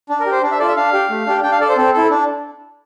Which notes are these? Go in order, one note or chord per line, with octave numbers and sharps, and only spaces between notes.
D4
A#4
G4
C5
D4
E5
F4 A4 D5
E5
D4 F5
G4
A3
D4 G4
D4 G5
F5
A4 D5
C5
C4 A4
E4 A4
D4